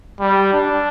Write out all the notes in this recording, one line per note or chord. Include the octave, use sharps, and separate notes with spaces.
G3
D4